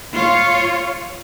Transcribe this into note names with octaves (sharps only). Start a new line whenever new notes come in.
F4 C#5